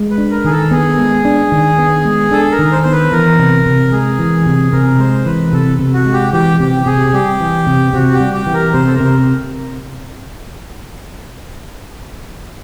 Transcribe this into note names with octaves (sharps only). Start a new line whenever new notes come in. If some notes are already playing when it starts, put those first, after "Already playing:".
Already playing: G#3
B4
D4
A#4
D#3 G#4
A4
B3 G#4
G#3
D4
D#3
B3
G#3
D4 A4
A#4
D#3
C5
B3 C5
B4
E3 A#4
C3
C3
G#3 G#4
E3
C3
C3 A#4
G#3 C5
E3 B4
C3 A4
C3
F#4
G#3
G4
E3 G4
C3 G4
C3 G#4
G3 G4
E3
C3
C3 F#4
G4
G3
G4
E3
A#4
C3 C5
A4
A#4
C3 C5